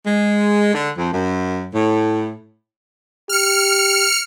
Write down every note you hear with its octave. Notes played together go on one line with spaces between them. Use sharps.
G#3
D3
F2
F#2
A2
G4 F6 C#7